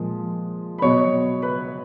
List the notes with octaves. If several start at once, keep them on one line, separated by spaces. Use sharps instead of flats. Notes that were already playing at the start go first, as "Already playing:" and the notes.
Already playing: A#2 F3 G#3 G#4
B5
B2 F#3 B3 C#5 C#6
B4 B5